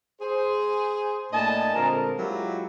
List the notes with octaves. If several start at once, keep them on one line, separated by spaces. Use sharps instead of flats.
G#4 C5
A2 A#3 D4 D#5 G#5 A5
A#2 D3 G#3 C4 A#4
F#3 G#3 E4 F4 G4